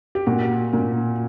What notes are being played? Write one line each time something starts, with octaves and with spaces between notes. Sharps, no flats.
G4
A#2 F#4
A#2